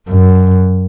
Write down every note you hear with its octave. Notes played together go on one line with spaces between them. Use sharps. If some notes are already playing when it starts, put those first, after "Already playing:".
F#2